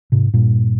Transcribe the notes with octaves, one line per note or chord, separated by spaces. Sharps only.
G#2 C3
G2 A#2